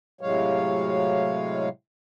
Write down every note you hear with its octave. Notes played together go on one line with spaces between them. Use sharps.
A2 C3 F#3 G#3 C#5 F5